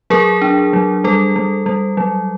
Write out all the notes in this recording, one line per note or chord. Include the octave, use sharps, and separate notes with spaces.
F#3 G#4 A#4
D4
F#3
G3 A4
G3
G3
F#3